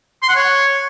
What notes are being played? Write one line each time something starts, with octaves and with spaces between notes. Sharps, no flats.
C6
F#5
C#5